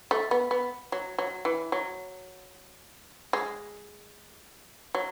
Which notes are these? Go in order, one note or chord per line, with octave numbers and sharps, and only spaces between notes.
A3
B3
B3
F#3
F#3
E3
F#3
G#3
F#3